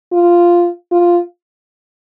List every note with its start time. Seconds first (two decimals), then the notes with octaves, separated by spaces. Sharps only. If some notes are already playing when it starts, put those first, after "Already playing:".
0.12 F4
0.92 F4